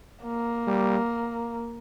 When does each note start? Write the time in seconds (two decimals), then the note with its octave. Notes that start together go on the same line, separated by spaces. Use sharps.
0.23 A#3
0.67 G3